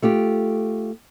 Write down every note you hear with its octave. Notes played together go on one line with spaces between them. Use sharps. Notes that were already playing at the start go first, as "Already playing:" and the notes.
A3 F4 G4